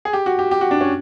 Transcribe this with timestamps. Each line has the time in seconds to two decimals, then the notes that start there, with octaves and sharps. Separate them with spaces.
0.05 G#4
0.13 G4
0.26 F#4
0.39 G4
0.51 G4
0.61 F#4
0.71 D4
0.81 C#4